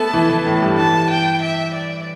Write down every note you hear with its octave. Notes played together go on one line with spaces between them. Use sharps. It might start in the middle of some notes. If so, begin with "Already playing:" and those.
Already playing: A3 B3 A4 B4 A5
E3 E4
E3 E4
A2 A3
G2 G3
E3 A5
G5
E5
D5